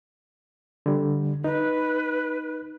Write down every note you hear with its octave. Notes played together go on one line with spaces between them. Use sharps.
D3 G3
D#4 B4